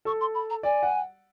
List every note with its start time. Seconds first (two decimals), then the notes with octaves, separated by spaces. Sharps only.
0.05 A4 C#6
0.20 C6
0.34 B5
0.50 A#5
0.63 D5 G#5
0.83 F#5